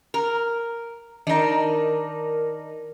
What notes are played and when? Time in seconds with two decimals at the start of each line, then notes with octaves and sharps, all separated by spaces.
0.14 A#4
1.27 D#3 D4 D#4 A#4